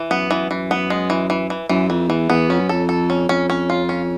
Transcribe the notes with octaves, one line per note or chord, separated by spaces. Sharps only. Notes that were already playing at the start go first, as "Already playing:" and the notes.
Already playing: E3
F#2 B3
E3
F#2 E3
B3
G#3
E3
E3
E3
F#2 E3
F2 E3
E2 E3
E2 B3
F2 C#4
F#2
F2 A4
A4
C#4
F2 C#4
C#4
F4
C#4